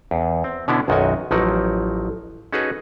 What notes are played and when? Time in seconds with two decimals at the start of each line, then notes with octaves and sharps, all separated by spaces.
0.11 E2
0.44 C4
0.68 B2 D3 B3 C#4 D4 E4
0.88 B1 F#2 D#3 F#4 D#5 G#5
1.31 A1 F3 F#3 D#4 A#4 F#5
2.53 C#4 D#4 F#4 G#4 A4 B4